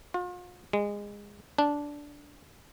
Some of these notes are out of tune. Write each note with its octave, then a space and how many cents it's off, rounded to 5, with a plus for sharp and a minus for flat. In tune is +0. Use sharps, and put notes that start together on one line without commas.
F4 +40
G#3 -25
D4 -10